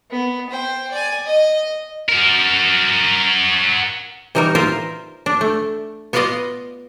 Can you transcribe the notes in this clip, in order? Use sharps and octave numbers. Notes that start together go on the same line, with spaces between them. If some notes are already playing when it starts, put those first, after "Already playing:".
B3
C5 G5
D5 G#5
D#5
F#4 A#4
E3 G3 D#4 F#4 A#4
F4 A#4 C5 E5
D4
A3
B3 F4 B4 D5 D#5 F5